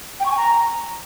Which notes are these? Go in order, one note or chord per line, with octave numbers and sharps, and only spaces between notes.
G5
C#6
G#5
A#5